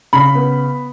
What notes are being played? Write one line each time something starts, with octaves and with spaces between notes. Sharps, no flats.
C#3 B5
B3